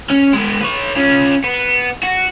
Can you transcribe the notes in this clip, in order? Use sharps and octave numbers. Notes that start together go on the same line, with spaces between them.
C#4
G#3 B3
B4 C#5
C#4 F4
B3
F#4